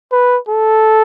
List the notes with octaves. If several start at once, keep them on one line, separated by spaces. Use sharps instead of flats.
B4
A4